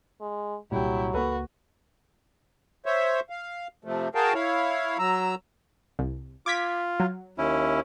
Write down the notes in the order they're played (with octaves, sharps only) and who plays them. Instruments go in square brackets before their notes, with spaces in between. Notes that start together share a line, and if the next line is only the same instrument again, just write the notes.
[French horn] G#3
[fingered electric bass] C2 A#2 [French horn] F#3 [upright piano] G3 G4 [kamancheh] E4 G5
[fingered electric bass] C#2 A#3 [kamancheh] F#4 [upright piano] A4 B4 B5
[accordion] C5 C#5 E5
F5
C3 F3 A3
F#4 G#4 A#4 F5 G5 A5
E4 C#5 F5
F#3 A#5 E6
[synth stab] C2
[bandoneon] F4 [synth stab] D6 G#6 B6
[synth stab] F#3
[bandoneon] D#2 C#4 E4